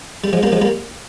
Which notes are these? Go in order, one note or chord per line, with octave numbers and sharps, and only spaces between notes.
G3
F3 G#3
G3 A#3
F3 G#3
G3 A#3